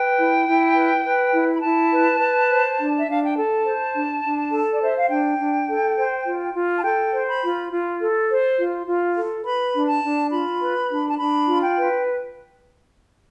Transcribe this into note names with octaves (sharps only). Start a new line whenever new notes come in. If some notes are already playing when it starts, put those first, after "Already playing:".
Already playing: B4 G5
E4
E4
B4
B4
E4
B5
E4 A5
B4
B4
C5
D4
E5
D4 F5
G5
A4 A5
C5
D4
D4
A4
D5
C5 E5
F5
D4 G5
D4
A4
C5
F4
F4
A5
A4 G5
C5
B5
F4
F4
A4
C5
F4
F4
A4
B4 B5
D4
A5
D4
F4 B5
B4
D4
A5
D4 B5
F4
G5
B4